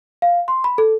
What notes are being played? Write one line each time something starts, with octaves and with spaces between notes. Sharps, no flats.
F5
C6
B5
A4